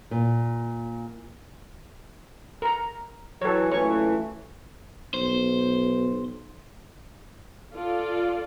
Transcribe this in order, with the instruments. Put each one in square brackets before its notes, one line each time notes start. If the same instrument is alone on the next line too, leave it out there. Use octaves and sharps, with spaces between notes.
[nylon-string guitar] A#2
[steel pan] A#4 A#5
[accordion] E3 F#3 [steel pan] A4 C#5
[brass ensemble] F#2 A#2 A3 [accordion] E3 [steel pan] C#5 C#6
[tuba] B1 [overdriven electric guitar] C5
[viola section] F4 A4 D5